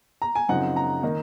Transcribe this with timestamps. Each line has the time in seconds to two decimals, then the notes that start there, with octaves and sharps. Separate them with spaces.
0.22 A#5
0.35 G#5
0.48 F#2 C#3 F3 C4 D#4 F#5
0.76 A#5
1.02 D#3 A#3 D#4